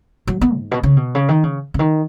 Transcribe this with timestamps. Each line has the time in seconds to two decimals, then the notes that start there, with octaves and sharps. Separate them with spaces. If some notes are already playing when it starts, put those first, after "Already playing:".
0.27 F#3
0.41 B3
0.56 G#2
0.71 B2
0.83 C#3
0.97 B2
1.15 C#3
1.28 D#3
1.44 C#3
1.74 C#3
1.79 D#3